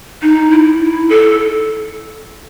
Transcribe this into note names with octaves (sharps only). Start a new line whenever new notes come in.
D#4
E4
A4